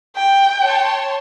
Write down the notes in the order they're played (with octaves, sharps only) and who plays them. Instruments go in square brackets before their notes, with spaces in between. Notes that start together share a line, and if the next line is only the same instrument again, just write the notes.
[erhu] G5
[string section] C#5 A5 C6